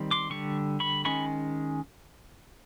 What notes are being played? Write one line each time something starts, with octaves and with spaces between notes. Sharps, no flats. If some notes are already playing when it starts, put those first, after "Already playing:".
Already playing: D#3 G3 C4
C6 D6
D3 G3 C#6
B5 C#6
D#3 G#3 C#4 B5 C#6